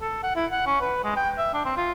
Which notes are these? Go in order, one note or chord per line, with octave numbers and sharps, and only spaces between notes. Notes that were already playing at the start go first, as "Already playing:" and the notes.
A4
F#5
E4
F#5
C#4
B4
G#3
G5
E5
D4
C4
F4